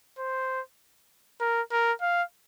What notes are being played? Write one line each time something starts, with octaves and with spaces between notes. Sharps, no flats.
C5
A#4
A#4
F5